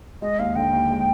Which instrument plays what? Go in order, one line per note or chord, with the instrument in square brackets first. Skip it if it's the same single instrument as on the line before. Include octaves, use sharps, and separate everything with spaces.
[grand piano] G#3 [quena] D#5
[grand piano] D#2 [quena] F5
[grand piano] D3 [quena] G5
[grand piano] D#2
G#3